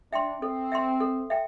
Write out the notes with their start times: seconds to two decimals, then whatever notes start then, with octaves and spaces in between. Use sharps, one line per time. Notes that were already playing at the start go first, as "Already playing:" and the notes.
0.12 D4 E5 G5 C6
0.41 C4 A4
0.72 E5 G5 C6
1.00 A4
1.30 E5 G5